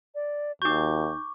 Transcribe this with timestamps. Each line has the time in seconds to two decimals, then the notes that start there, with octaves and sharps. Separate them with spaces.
0.15 D5
0.62 D#2 D#4 F#4 C#6 D6 G6